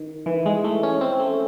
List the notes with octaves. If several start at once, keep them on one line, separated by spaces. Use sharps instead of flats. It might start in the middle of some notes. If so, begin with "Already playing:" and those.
Already playing: D#3
E3
G#3
A3
C#4
C4
A3